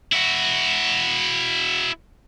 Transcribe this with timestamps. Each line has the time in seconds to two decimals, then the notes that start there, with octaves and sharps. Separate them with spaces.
0.12 E4 F#4